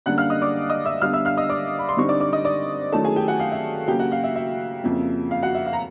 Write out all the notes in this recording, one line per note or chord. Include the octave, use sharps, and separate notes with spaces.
F#2 D3 G3 A#3 D4 F#5 F#6
F5 F6
D#5 D#6
D5 D6
D#5 D#6
E5 E6
D3 G3 B3 D4 F5 F6
E5 E6
F5 F6
D#5 D#6
D5 D6
B5
C6
D3 G3 C4 D#4 C#6
D5 D6
D5 D6
D#5 D#6
D5 D6
D#3 F#3 A3 C#4 E4 A4 A5
G#4 G#5
G4 G5
F#4 F#5
F5
E5
C#3 F#3 A#3 G4 G5
F#4 F#5
F5
E5
E5
F2 C#3 F3 A#3
F5
F#4 F#5
E5
F5
A#5